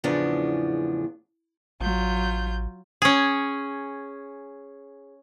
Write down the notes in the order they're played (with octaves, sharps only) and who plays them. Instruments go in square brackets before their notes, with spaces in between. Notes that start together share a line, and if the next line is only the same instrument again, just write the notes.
[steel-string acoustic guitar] E2 A2 C#3 F3 B3 D4
[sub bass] A1 [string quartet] F#3 F4 G6
[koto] C#4 G#4